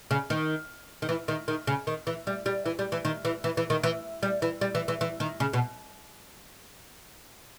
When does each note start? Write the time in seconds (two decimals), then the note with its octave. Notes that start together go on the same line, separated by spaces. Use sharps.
0.11 C#3
0.30 D#3
1.02 D#3
1.09 E3
1.28 D#3
1.48 D#3
1.67 C#3
1.87 D#3
2.07 E3
2.27 G3
2.46 G3
2.66 E3
2.79 G3
2.92 E3
3.05 D#3
3.25 E3
3.44 E3
3.57 E3
3.70 D#3
3.83 E3
4.23 G3
4.42 E3
4.61 G3
4.75 E3
4.88 E3
5.01 E3
5.20 D#3
5.40 C#3
5.53 B2